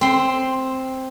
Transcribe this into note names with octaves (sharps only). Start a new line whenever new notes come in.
C4 C6